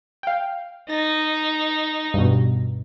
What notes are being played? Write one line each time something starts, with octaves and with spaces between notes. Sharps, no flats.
F5 G5
D#4 A6 A#6
G2 B2